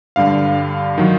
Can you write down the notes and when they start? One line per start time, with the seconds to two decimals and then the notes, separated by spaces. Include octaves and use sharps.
0.16 G2 D3 G3 F5
0.98 D#3 F#3